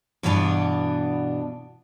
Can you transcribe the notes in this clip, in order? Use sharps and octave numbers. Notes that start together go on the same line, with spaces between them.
G2 B2 E3 B3 D4